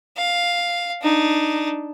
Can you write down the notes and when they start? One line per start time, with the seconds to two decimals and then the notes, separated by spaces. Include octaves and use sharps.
0.17 F5
1.02 D4 D#4